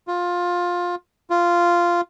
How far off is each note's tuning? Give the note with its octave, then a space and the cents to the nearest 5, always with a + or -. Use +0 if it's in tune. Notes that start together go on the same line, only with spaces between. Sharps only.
F4 +15
F4 -10